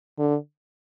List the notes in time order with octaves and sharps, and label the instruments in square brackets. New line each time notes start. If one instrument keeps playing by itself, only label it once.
[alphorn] D3